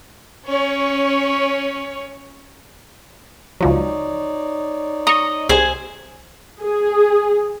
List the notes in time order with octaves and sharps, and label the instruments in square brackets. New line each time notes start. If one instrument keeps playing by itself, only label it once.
[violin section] C#4 C#5
[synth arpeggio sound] C#2 F3 F#3 [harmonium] D#4 C#5 D5
[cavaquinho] D#5 [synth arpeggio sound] A#5 C#6
[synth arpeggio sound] C2 [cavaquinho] G#4 C5 G#5
[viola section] G#4